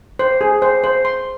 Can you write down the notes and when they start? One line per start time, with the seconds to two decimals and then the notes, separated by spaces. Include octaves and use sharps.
0.19 C5
0.41 G#4
0.62 C5
0.84 C5
1.05 C6